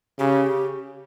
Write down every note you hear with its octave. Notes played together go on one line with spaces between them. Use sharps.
C#3 G4